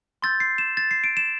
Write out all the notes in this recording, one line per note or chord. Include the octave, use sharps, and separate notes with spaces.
C6 E6 G6 A6
C7
E7
A6
C7
D7
E7